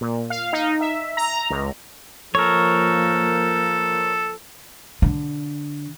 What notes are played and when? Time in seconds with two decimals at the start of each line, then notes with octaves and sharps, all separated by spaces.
0.01 A#2
0.30 F5
0.53 D#4
0.81 E5
1.17 A#5
1.50 C#2
2.35 F3 A#3 A4 A#4 C#5
5.02 D3